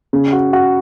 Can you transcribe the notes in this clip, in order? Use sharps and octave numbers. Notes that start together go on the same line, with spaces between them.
C#3
F#4
F#4